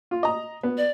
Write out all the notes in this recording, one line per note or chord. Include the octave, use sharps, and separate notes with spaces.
F4
D#5 A#5
B3
D5